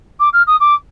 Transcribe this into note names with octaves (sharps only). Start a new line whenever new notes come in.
D6
F6
D#6
D6